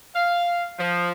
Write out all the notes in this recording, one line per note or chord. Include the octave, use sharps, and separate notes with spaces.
F5
F3